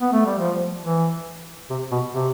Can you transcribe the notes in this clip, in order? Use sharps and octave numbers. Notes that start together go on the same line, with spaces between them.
B3
A3
G3
F3
E3
C3
B2
C3